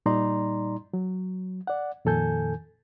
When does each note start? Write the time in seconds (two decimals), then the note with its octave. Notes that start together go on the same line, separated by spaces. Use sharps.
0.06 A#2 G3 D#4 D5 A#5 C6
0.93 F#3
1.67 D5 F#5
2.05 F2 A#2 D#3 A4 G#5 G6